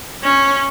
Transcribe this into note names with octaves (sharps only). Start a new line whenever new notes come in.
C#4